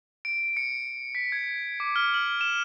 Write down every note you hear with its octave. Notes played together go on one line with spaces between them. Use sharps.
D7
C#7
B6
G#6
D6
F6
F#7
E7